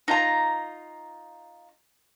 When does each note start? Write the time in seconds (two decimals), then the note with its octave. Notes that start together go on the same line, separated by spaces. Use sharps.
0.08 D#4 F4 A#5